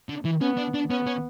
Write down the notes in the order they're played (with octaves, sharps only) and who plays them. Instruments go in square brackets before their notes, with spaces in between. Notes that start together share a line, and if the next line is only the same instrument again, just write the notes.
[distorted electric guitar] D3
E3
[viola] B3 [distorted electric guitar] C#4
[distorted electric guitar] D4
D4
[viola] B3 [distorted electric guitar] C#4
[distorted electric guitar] C#4